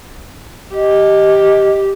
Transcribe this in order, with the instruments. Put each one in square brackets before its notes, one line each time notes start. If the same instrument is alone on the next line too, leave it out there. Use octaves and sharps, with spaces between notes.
[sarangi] G4 [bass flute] D#5